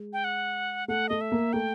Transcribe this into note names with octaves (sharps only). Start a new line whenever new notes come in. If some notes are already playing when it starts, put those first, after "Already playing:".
Already playing: G#3
G5
F#5
A3 F#5
A3 D#5
E5
A#3
A3 G5